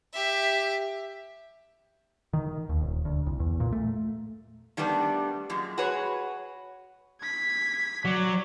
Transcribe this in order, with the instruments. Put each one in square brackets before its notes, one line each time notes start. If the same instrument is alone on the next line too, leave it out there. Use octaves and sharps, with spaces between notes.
[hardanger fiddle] G4 E5
[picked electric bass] D#3
D#2
D#1
D2
C2
E2
A#2
A3
[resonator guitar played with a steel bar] D#3 G3 A3 B3 D4
F#2 A#2 G#3
F#4 G#4 B4 C#5
[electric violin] G#6 B6
[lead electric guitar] F#3 [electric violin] D5